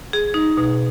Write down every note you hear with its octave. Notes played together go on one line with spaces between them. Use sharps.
G#4
D#4
B2